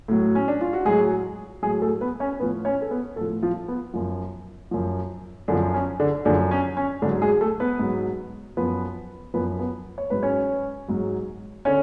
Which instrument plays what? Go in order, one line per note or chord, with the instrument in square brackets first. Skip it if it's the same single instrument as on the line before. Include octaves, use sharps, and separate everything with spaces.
[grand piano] A2 F#3
C#4
D4
F4
F#4
A2 F#3 G#3 G#4
A2 F#3 G#3 G#4
A3 A4
B3 B4
C#4 C#5
A2 B3 B4
F3
C#4 C#5
A4
B3 B4
A2 A3 A4
F3
F3 F4
B3
F#2 F3
F#2 F3
F#2 D3 D4
F3
C#4
D3 D4
F#2 D3 F3 D4
C#4
C#4
G#2 D3 F#3 D4
G#3 G#4
A3 A4
B3 B4
G#2 F#3
F#2 F3 B3 B4
F#2 F3 B3 B4
B3 B4
C#5
G#2 F#3 B4
C#4 C#5
G#2 F#3
D3 C#4 C#5